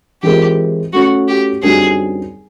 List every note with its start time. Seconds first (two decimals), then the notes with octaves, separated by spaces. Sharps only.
0.23 E3 G#3 C4 F4 G4 A#4
0.93 F#3 A3 C#4 F#4
1.28 G4
1.62 F#2 D3 G3 C4 D#4 G#4